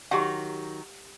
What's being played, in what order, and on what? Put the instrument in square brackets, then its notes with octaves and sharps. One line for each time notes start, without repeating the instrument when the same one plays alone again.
[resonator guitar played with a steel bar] D#3 F#3 [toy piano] G4 F#5